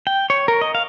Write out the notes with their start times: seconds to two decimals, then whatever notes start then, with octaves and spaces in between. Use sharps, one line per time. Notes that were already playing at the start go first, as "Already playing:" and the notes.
0.07 G5
0.30 C#5
0.48 A#4
0.61 D#5
0.75 F5